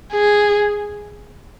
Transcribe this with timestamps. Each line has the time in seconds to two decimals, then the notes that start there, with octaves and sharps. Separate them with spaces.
0.13 G#4